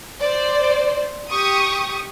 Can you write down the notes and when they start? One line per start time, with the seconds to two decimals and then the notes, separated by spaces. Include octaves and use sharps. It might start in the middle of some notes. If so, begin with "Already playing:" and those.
0.20 C5 D5
1.29 G4 C#6 D#6